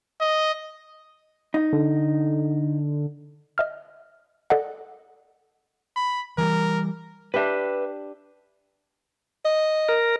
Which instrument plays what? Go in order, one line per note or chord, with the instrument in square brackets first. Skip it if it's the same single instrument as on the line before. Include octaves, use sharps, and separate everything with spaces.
[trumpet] D#5
[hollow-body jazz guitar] D#4
[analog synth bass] D3
[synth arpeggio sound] D#5 E5 F6
A4 D5 D#5 F#5
[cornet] B5
[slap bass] E3 F3 G3 [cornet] A#4
[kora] D4 G4 [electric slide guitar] B4 E5
[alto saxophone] D#5
[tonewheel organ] A#4